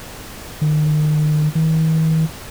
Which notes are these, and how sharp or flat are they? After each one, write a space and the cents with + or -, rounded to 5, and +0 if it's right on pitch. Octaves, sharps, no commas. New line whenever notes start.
D#3 -40
D#3 +45